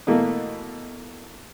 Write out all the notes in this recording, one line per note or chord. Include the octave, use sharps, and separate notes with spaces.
B2 E3 A3 A#3